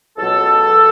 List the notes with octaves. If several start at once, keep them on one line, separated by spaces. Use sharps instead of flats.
C#2 B2 F#3 A4